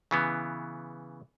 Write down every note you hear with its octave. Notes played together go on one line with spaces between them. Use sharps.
C#3 E3 B3